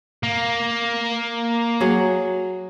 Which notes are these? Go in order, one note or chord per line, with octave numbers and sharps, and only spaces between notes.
A#3
F#3 G#4 F#5